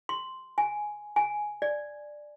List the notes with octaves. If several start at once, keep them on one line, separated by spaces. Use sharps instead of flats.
C6
G#5
G#5
D5